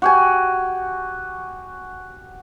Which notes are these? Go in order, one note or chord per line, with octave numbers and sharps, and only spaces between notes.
F#4 G4 G#5